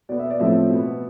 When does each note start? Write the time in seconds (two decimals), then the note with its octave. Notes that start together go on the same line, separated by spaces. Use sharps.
0.09 B2 B3 D5
0.19 E5
0.30 D5
0.39 A2 F3 A3 C4 E5
0.70 B2 B3